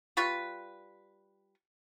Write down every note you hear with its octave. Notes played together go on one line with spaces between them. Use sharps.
G3 F4 B4 C#6